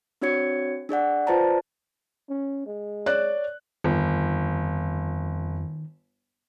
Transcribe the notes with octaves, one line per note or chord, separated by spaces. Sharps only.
C4 D4 F#4 C#5 G#6 C#7
D4 G#4 D5 F#5
F4 B4 C5 D5 A5 A#5
C#4
G#3
C#5 D5 F#6
G1 F2 D#3